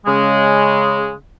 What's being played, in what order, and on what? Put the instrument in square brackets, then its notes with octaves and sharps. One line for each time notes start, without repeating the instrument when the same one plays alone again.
[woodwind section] C#3 G#3